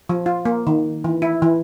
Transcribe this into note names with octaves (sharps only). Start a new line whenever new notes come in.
F3
F4
A#3
D#3
E3
E4
E3